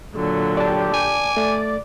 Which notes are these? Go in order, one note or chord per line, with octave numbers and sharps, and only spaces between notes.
A#2 D3 F#3
G4 D5 A5
G#5 D6
A3 D5